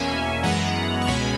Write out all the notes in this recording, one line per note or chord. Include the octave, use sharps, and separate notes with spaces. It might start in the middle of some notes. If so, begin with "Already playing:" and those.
Already playing: E2 B2 A#3 C#4 E5 G#5
F#2 E3 G#3 B3 F#5 A#5
C#6
C#2 B2 G#3 C#4 G#5 B5